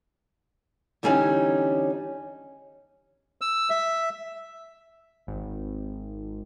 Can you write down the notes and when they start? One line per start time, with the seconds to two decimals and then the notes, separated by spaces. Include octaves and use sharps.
1.03 E2 D3 G3 C#4 D#4 G#5
3.41 E6
3.70 E5
5.27 G#1